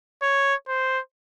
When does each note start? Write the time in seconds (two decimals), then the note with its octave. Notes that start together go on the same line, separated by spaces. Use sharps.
0.23 C#5
0.68 C5